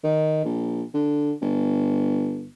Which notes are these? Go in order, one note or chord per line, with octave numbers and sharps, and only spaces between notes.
D#3
A#1
D3
G1